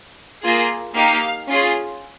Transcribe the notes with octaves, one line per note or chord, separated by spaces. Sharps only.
A#3 F4 G#4
A#3 D#4 G4 F5
C#4 F4 G#4